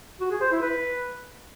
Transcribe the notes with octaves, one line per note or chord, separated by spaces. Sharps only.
F#4
G#4
C5
E4
B4